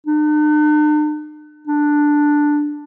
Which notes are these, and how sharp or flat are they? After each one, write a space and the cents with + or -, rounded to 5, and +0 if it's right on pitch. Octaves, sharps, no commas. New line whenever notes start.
D4 +45
D4 +5